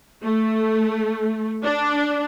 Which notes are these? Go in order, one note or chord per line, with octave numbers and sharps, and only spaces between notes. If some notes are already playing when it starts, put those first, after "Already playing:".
A3
D4